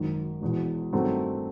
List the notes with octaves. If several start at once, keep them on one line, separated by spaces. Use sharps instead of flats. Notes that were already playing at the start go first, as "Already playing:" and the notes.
Already playing: G#1 F#2 D#3
E1 E2 B2
G2 D#3 F#3 A3 C4